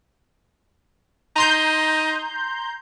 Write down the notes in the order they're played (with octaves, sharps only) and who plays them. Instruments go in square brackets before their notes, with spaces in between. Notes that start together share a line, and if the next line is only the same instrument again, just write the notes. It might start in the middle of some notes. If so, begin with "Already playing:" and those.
[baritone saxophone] D#4 [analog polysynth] A#5 C6 G6